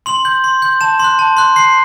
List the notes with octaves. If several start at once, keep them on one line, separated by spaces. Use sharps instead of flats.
C6 F#7
G6
C6
G6
A5 E7
C6 F#6
A5
C6 F#6
C6 C7